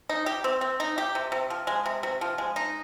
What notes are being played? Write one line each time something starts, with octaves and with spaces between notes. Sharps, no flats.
D#4
G4
C4
C4
D#4
G4
C3
C3
F3
G#3
C3
C3
F3
G#3
D#4